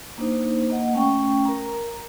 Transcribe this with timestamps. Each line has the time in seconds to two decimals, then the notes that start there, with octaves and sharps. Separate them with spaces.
0.18 A#3 D4 D#4 C5
0.70 A#3 D#5 F#5
0.93 A3 C#4 G5 C#6
1.45 A#4 A#5